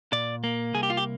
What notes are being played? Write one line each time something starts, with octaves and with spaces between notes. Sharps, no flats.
A#2 D5
A#3
C2 G#4
G4
F4
G4